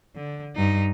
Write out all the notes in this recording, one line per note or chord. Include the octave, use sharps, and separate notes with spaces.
D3
G2 D#4